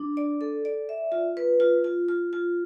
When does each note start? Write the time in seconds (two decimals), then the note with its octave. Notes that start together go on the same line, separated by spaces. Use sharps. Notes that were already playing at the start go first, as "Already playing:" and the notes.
Already playing: D4
0.17 D5
0.41 A4
0.65 D5
0.89 E5
1.12 F4
1.37 B4
1.60 F4
1.84 F4
2.09 F4
2.33 F4